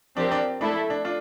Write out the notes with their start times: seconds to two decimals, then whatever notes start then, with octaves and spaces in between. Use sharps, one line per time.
0.17 F3 C4 D4 G4 A#4
0.31 D4
0.61 A3 D4 E4 A4
0.90 D4
1.05 D4 F4